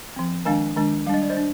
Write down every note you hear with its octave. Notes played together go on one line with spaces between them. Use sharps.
F3 C4
D#3 G#3 D4 F5 G#5
D#3 G#3 D4
G3 D4 D#5 F5
D5
C5 D#5
D4